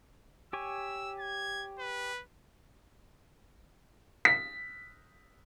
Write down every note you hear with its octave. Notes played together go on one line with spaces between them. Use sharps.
G4 C#5 G#5 E6
G#6
B4
B6